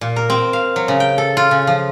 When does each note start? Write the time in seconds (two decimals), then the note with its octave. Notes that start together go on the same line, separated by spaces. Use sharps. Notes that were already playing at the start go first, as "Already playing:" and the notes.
0.01 A#2
0.16 A#4
0.30 C4
0.53 F5
0.76 F#3
0.88 C#3
1.00 G5
1.18 A4
1.37 F4
1.51 C#3
1.67 F3